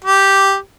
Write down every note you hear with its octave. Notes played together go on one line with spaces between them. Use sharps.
G4